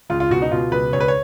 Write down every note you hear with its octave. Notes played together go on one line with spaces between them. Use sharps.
C#2 F4
F4
B2 F#4
D#4
B2 F4
C#2 B4
C#2 C#5
B4
C#5